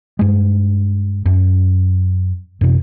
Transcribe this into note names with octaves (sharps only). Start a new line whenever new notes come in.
G2 G#3
F#2
F#2 C3